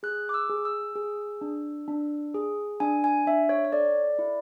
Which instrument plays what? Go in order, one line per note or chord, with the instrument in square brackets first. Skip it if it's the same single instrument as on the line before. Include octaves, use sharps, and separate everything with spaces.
[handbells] G#4 F#6
D6
E6
G#4
E6
G#4
D4
D4
G#4
D4 G#5
G#5
D4 E5
C#5
C#5
A4 D5
E4